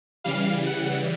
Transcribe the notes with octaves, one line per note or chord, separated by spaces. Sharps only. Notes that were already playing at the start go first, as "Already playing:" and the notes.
C#3 E3 G3 F5
F#5